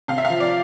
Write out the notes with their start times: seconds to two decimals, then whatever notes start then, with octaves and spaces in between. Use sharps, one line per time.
0.08 C3 F5
0.18 E5
0.25 F5
0.30 F3
0.40 D5